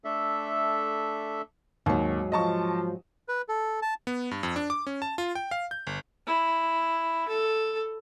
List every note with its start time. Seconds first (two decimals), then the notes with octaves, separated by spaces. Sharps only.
0.04 A3 D4 A4 E5
1.86 D#2 G#2 F#3
2.32 F3 D#5 A5 C#6
3.28 B4
3.49 A4
3.82 A5
4.07 B3
4.31 G2
4.43 F2
4.56 D4
4.70 D6
4.87 C#4
5.02 A5
5.18 F4
5.35 G5
5.51 F5
5.71 G6
5.87 G1
6.27 E4
7.28 A4